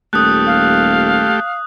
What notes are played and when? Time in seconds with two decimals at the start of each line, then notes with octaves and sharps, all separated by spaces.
0.13 D#1 A3 G4 D#6 F#6
0.47 F5